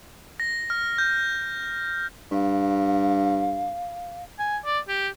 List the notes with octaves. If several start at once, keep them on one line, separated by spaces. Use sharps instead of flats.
A#6
F6
G6
G2 F5
G#5
D5
G4